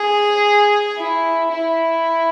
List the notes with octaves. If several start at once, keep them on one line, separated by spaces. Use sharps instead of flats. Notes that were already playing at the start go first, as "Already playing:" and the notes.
Already playing: G#4
E4
E4